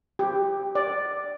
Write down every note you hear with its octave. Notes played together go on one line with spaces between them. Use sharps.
G4
D5